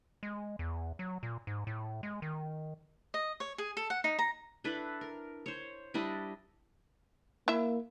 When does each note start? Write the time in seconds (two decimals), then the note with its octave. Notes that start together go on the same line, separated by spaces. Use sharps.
0.23 G#3
0.59 E2
0.99 F#3
1.23 A#2
1.47 G#2
1.67 A2
2.03 G#3
2.22 D#3
3.14 D#5
3.40 C#5
3.58 G#4
3.77 A4
3.90 F#5
4.04 D#4
4.19 A#5
4.64 D4 E4 A4 B4
5.01 A#4
5.46 C5 C#5
5.94 G3 D4 E4 D#5
7.48 A#3 E4 E5